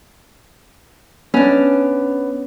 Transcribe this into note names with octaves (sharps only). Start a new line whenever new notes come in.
B3 C#4 D4